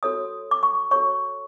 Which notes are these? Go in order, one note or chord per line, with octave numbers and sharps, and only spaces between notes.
F#4 A4 C#5 D#6
D6
C#6
F#4 A4 C#5 C#6